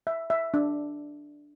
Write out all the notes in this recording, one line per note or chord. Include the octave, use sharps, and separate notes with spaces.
E5
E5
D4